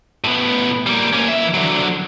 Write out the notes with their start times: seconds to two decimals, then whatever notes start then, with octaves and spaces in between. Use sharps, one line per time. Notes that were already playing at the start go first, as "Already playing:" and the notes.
0.24 A2 B3
0.86 G3 A#3
1.13 A#3 C#4
1.28 E3 E5
1.54 D3 F#3